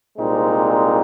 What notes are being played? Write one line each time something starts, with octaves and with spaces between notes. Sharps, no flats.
C2 A#2 G#3 C4 D#4